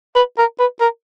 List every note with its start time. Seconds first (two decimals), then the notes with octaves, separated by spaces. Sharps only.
0.16 B4
0.38 A#4
0.59 B4
0.81 A#4